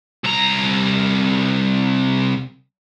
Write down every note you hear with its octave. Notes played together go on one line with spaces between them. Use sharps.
C2 A#5